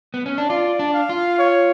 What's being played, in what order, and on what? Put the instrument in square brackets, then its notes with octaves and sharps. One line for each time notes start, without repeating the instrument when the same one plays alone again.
[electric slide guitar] B3
C#4
D4
[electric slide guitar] F4 [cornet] D5
[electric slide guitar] D4
[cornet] F5
[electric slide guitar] F4
[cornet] C#5